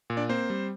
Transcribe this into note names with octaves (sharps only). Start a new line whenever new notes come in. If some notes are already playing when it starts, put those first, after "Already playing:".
A#2
D4 D5
A#3 C4 C5
G3